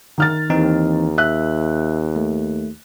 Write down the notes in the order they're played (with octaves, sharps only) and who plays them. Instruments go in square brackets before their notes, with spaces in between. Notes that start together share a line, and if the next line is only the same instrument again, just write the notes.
[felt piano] D#3 F6 A6
[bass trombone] D#2 [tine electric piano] E3 C4 D#4
[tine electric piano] E5 [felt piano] F#6
[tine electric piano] A3